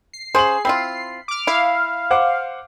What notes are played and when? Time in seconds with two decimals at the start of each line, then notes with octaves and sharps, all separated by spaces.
0.13 C7
0.35 C#3 G#4 C5 F#7
0.65 C4 E4 F4 B5
1.28 D6 F6
1.47 E4 F5
2.11 C5 F#5 D6